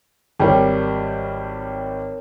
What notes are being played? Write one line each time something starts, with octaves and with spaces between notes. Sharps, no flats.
G#1 G3 A#4 C#5 G5